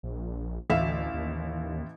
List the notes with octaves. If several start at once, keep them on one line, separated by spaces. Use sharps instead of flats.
A#1
A1 D2 E5 F5
D#2